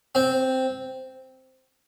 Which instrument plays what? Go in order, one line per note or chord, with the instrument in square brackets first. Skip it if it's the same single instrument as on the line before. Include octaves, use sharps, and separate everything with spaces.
[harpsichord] C4